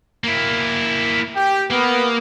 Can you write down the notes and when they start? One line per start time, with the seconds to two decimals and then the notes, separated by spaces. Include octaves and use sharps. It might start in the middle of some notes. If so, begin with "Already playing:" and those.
0.24 A#3 E4
1.36 G4
1.71 A#3 B3